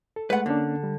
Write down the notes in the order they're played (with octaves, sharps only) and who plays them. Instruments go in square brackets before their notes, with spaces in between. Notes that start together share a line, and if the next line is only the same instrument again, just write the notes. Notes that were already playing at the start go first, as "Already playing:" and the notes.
[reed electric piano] A4
[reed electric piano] G#3 A3 [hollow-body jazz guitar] B4 F#5
[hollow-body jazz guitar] D3 [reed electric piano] A#3 C#4 D4
[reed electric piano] G3